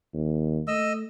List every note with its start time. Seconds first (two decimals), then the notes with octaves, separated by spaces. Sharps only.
0.13 D#2
0.67 A3 D#5 E6